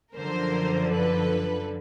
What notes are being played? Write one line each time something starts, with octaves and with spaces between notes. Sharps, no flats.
F#2 D3 F3 A#4 C5
A4 B4